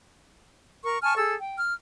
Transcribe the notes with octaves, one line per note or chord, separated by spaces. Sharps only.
A#4 C#6
G#5 A5 C#6 F6
G#4 A4 E6
G5
F6